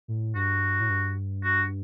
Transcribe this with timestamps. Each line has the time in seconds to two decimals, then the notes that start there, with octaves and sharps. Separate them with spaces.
0.08 A2
0.35 G2 F#4
0.80 A2
0.89 G2
1.44 F#4